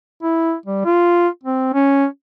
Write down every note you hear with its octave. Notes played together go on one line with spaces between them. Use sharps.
E4
G3
F4
C4
C#4